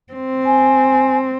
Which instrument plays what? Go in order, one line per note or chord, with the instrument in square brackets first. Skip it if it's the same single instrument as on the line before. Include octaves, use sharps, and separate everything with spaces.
[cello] C4
[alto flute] G#5